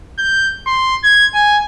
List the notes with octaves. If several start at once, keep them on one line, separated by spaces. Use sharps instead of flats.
G6
C6
G#6
G#5